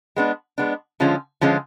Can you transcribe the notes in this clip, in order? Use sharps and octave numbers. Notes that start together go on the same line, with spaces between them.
G#3 B3 D4
G#3 B3 D4
D3 F3 G#3 C#4 F4
D3 F3 G#3 C#4 F4